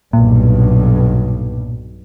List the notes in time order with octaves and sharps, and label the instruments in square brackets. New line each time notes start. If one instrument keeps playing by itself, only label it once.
[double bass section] B1 G2 [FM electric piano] A#2